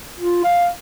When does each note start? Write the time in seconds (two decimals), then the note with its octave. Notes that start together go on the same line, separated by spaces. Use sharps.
0.20 F4
0.44 F5